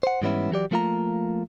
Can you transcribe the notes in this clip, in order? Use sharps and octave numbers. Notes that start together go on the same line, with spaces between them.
C5 F#5
G#2 E3 G3 B3 C#4 E4
E3 F#3 G4 D5
F3 A3 A#3 F4 F5 A#5